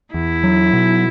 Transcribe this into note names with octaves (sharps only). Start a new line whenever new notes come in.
E2 E4
F#3
B2